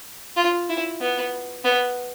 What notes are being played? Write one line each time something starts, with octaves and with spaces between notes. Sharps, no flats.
F4
E4
B3
B3